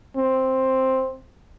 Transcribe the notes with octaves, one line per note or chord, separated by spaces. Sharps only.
C4